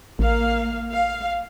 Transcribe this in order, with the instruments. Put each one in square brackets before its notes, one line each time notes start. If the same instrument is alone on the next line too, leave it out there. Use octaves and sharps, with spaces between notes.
[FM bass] A1 [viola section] A#3 F5
[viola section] F5